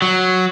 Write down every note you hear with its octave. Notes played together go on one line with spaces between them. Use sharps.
F#3